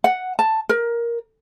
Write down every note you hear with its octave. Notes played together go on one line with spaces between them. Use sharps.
F#5
A5
A#4